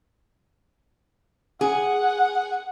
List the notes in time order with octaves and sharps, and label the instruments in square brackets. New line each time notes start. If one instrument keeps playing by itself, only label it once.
[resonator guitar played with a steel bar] G#4 [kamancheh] F#5